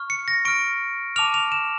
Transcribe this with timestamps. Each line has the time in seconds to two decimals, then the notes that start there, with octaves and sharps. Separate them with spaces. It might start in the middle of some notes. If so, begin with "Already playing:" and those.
Already playing: C#6 F6
0.10 C#7
0.28 A#6
0.45 C#6 F6 D7
1.16 A5 D6 F6 F7
1.34 F7
1.52 E7